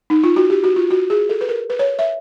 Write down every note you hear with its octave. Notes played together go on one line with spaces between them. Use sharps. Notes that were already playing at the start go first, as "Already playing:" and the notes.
D#4
F4
F#4
G4
F#4
F4
F#4
G#4
A4
B4
A#4
B4
C#5
E5